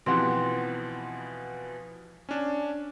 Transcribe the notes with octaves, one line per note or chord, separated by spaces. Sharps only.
B2 E3 F3 C4 G4 F#5
C#4 D4